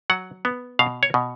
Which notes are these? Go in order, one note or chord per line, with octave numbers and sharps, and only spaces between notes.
F#3 F#5
B3
B2 F5
C#5
B2